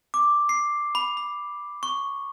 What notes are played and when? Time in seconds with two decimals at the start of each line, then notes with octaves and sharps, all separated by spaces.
0.14 D6
0.49 C7
0.95 B5
1.17 B5
1.83 C#6